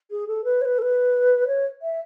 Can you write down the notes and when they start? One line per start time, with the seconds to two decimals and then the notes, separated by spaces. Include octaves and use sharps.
0.10 G#4
0.27 A4
0.44 B4
0.61 C#5
0.65 B4
0.78 A4
0.82 B4
1.47 C#5
1.82 E5